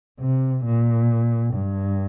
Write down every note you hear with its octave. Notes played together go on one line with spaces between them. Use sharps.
C3
A#2
G2